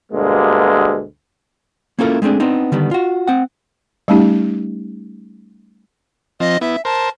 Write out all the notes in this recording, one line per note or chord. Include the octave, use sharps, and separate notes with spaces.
D2 G2 B2 G#3 A#3
A#3 C#4 E4 F4 A4 A#4
G#3 A3 C4 D4 G#4
B3 C4 D4 D#4
D3 D#3 G3 B3
F4 F#4
C4 F#5
G3 A3 C#4 D#4 G4
F3 C4 D#5
B3 E4 E5
A#4 C5 A5